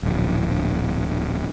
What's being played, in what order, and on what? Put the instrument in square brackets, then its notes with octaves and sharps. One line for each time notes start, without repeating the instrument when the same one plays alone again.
[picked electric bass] D1 A#1